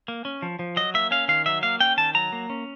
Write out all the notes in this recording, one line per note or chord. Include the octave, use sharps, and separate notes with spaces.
A#3
C#4
F3
F3
F#3 D#5
A#3 E5
C#4 F5
D#3 F5
F#3 E5
A#3 F5
C#4 G5
D#3 A5
F#3 A#5
A#3
C#4